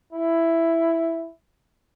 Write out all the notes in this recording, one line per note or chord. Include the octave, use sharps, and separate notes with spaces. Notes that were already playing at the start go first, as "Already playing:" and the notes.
E4